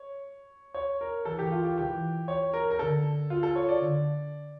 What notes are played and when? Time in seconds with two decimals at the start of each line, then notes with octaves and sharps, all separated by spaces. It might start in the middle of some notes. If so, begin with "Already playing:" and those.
Already playing: C#5
0.74 C#5
1.01 A#4
1.25 E3 A4
1.39 G4
1.52 F4
1.64 G4
1.77 E3 G4
2.28 C#5
2.54 A#4
2.71 A#4
2.79 D3 A4
3.30 F4
3.43 A4
3.56 C#5
3.69 D5
3.81 D3